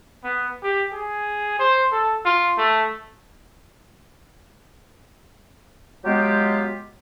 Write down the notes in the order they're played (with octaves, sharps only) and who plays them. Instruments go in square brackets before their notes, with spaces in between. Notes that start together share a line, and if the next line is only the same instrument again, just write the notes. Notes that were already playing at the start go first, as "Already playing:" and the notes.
[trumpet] B3
G4
G#4
C5
A4
F4
A3
[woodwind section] F#3 G#3 B3 F4 G4